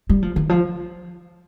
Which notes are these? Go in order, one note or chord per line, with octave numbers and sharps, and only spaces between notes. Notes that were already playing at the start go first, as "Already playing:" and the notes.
G3
F3
D#3
F3